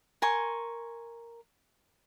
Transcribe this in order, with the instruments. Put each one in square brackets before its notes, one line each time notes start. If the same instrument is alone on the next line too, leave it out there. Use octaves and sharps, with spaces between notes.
[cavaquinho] A#4 G#5 C6 C#6